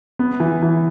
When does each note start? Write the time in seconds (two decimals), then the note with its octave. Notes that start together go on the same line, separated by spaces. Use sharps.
0.19 B3
0.40 E3
0.62 E3